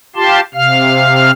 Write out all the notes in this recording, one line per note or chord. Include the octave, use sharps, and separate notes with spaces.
F4 G4 A5 C6
C3 F5 F6